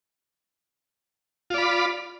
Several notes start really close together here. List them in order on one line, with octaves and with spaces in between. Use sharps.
F4 D5 B5